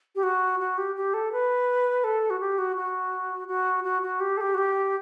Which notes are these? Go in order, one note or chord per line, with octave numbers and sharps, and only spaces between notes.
G4
F#4
F#4
G4
G4
A4
B4
A4
F#4
G4
F#4
F#4
F#4
F#4
F#4
G4
A4
G4
F#4
G4